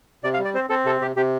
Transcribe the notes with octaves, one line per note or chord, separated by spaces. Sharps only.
C3 D5
F5
G3
D5
C4 C5
C4 A4
C3 A4
C3 G4
C3 G4